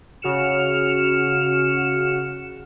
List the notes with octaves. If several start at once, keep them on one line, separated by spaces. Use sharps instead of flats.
C#3 F#4 F6 C#7 E7